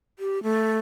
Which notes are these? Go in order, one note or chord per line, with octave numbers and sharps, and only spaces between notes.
G4
A3